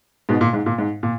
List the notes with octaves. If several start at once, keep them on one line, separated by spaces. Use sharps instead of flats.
G#2 B2
A#2
G#2
A#2
G#2
A#2